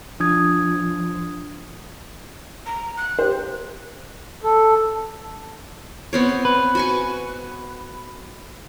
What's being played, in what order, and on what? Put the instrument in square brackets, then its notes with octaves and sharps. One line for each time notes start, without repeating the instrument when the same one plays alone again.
[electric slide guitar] F3 [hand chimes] D4 D#6 G#6
[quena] A#5
F#6
[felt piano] G4 C5
[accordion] A4
[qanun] B3 C4 C#5
[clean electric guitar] B4
[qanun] F#4 G#5 C#6